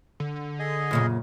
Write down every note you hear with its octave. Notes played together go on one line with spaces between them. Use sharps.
D3
G#4 D#5
F#2 A#2 C#3